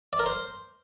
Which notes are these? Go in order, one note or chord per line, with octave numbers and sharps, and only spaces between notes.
D5
A#4
C5